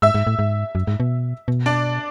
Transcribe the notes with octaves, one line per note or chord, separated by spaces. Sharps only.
G#2 E5 E6
G#2
A2
G#2
F#2
G#2
B2
B2
D4 D5